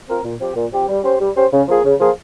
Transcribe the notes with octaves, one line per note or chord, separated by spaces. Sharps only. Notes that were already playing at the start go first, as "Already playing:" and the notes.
C4 F4 A#4
A#2
F3 C4 G4
A#2
F3 C4 G4
G3
C#4 G4 C5
G3
C#4 G4 C5
C#3
F3 A#3 F4 G#4
C#3
F3 A#3 F4 G#4